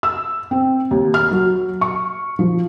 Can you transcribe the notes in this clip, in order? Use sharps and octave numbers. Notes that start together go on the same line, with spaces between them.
E6
C4
D#2
F6
F#3
C#6
F3